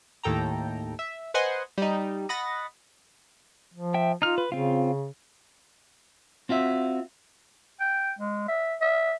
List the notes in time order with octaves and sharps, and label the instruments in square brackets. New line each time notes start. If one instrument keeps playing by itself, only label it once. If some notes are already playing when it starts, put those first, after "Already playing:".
[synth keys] D#2 A2 A4 G5 A#5
E5
B4 C5 D#5 F#5 G#5 C6
G3 D#4
D#5 F#5 B5 A6 A#6
[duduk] F3
[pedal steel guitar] E5 G5
[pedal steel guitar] D#4 F6 [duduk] F4
[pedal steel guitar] B4
[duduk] C#3 [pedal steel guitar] C4 F4
[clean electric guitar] C4 F4 F#4 E5
[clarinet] G5
G#3
E5
E5